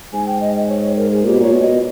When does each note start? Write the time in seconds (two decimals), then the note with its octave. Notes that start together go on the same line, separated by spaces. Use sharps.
0.13 G#2 G#5
0.27 G5
0.41 D#5
0.56 D#5
0.69 C#5
0.82 C#5
0.97 A#4
1.11 G#4
1.25 A#2 G4
1.32 B2
1.40 A#2 C#5
1.52 B2
1.61 D#5